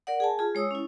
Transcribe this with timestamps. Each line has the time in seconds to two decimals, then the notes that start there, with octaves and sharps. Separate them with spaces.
0.07 A#4 D5 F#5
0.20 G#4 G#5 A5
0.39 F4 G#4
0.55 G#3 C#5 D#6 E6
0.71 C#4 E4